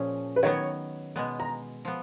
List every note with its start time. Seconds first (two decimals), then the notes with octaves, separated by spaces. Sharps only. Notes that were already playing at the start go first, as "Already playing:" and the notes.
Already playing: A#2 F3 C#4 G#4
0.36 B4
0.43 D#3 F#3 B3 C#5
1.16 B2 G#3 B3
1.40 A#5
1.85 F3 B3